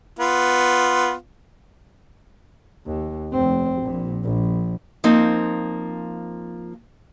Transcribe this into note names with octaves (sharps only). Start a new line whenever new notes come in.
B3 F4
D#2
F1 C4
A#1 A#2
A#1
F3 A#3 C4 D#4